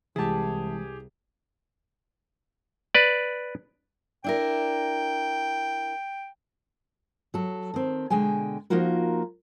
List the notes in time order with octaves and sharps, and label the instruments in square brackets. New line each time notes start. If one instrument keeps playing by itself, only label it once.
[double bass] C2 [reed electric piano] E3 G#3 [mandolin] E4 A5 [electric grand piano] G4 G#4
[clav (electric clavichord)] B4 D5
[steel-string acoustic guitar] D4 E4 A#4 [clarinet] G5
[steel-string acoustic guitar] F#3 A4
D#3 C4
B2 D3 G#3 G5 G#5
F3 A#3 D#4 F4 F#4 A#4